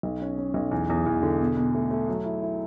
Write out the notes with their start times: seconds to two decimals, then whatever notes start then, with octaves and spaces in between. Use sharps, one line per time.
0.03 B1
0.21 C#4
0.38 C#4
0.54 B1
0.71 E2
0.90 E2
1.06 E2
1.23 D3
1.41 B2
1.57 B2
1.75 A3
1.91 A3
2.09 F#3
2.25 E4
2.42 E4